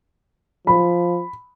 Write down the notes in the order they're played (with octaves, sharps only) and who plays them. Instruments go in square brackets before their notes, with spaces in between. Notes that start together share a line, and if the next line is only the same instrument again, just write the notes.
[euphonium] F3 [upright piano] B5